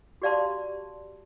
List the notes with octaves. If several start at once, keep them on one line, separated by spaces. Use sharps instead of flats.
F#4 G4 D5 F5 A5 C6